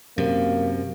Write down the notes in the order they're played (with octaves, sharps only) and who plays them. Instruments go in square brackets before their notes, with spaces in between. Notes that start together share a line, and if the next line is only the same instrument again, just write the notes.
[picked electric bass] F#2 C3 [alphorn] A#3